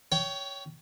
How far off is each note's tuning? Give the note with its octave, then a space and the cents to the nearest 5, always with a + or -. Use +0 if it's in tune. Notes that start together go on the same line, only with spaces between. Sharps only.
C#5 +15 G5 -10